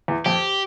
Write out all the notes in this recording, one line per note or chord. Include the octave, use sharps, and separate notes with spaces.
E2
F2 G4